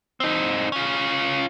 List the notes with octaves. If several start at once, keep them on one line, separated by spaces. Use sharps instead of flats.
C4 D#4
C#4 F4